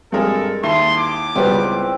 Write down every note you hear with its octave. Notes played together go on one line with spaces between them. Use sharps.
G2 G#3 C4 D4 A4 A#4
D#2 E4 A5 C6
D6
C#2 G3 B3 C4 B4 F#5